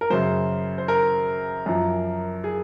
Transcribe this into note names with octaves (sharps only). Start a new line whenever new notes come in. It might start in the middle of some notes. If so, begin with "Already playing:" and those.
A#4
F#2 C#3 F#3 C5
C5
A#4
F#2 F3
G#4